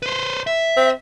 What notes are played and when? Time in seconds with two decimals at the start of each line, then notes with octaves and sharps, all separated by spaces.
0.02 B4 C5
0.47 E5
0.77 C4